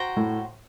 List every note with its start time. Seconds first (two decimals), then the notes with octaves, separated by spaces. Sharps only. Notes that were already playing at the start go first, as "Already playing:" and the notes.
Already playing: F#4 C5 G5 A#5
0.17 A2